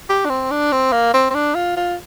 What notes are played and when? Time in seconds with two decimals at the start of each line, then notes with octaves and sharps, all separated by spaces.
0.09 G4
0.25 D4
0.29 C4
0.51 D4
0.72 C4
0.92 A#3
1.14 C4
1.30 C4
1.35 D4
1.55 F4
1.77 F4